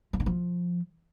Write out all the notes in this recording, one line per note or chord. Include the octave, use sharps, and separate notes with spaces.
F3
D3
F3